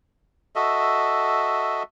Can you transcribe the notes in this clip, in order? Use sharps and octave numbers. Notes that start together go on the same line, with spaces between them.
F#4 A4 D#5 E5